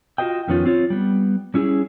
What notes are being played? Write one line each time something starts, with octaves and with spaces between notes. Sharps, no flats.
F4 F#4 G#4 A#4 D#5 G5
F2 D#3 B3 C#4 F4
C4 F4 C#5
G3 B3
G3 C#4 E4 G#4